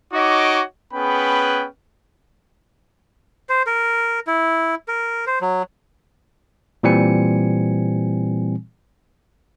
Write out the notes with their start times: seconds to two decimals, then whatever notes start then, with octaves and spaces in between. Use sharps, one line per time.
0.13 D#4 F#4 C#5 D#5 D6
0.93 B3 C#4 G#4 B4 G5 B5
3.49 C5
3.67 A#4
4.27 E4
4.88 A#4
5.27 C5
5.41 F#3
6.83 A#2 E3 G3 C4 G#5 C#7